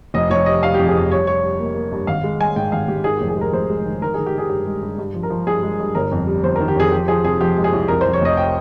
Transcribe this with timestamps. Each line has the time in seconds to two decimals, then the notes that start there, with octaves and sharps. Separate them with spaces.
0.14 F1 D#5
0.30 F1 C#5
0.46 G3 D#5
0.63 G3 F5
0.74 F2 G4
0.87 G#4
0.95 F2
1.11 G3 C#5
1.27 G3 C#5
1.43 G3
1.59 A#3
1.75 A#3
1.92 G2
2.07 G#1 F5
2.24 G#3
2.41 G#3 G#5
2.56 G#2 G5
2.72 G#1 F5
2.88 G#2 G4
3.04 D#3 G#4
3.17 F1 G4
3.28 G#4
3.37 G#3 A#4
3.53 F1 C5
3.70 G#3
3.86 D#3
4.02 D#3 A#4
4.14 D#3 G#4
4.26 G4
4.34 D#3 G#4
4.49 G2 G4
4.66 G#3
4.82 G2
4.98 G2
5.14 F3
5.23 A#4
5.30 F3
5.47 G2 G#4
5.63 G#3
5.80 G2
5.95 G1 A#4
6.11 F2
6.27 G3
6.43 G1 C5
6.56 D#3 A#4
6.68 G4
6.76 F2 G#4
6.92 F3 G4
7.08 F3 G#4
7.24 C3 G#4
7.41 F3 G4
7.57 G#3
7.64 G#4
7.73 C2
7.88 F2 A#4
8.01 F2 C5
8.13 C#5
8.21 F1 D#5
8.37 G5